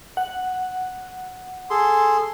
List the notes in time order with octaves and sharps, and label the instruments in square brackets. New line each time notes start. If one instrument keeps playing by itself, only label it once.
[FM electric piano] F#5
[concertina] G#4 A4 C6